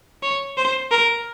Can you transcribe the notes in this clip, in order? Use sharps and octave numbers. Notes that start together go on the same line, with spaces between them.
C#5
C5
A#4